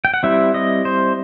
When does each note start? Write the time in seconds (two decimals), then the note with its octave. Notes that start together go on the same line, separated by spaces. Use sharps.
0.05 G5
0.14 F#5
0.23 G3 C4 E4 E5
0.54 D#5
0.85 C5